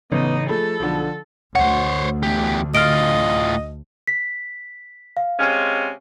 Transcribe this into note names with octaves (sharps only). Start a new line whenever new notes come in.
A1 C#3 B3 D#4
F3 A3 G#4 A4 A5 B5
B1 D3 F3
D2 C5 C#5 F#5
E2 G4
A2 F4 D#5 F6 D7
B6
F5
C3 G#3 C#4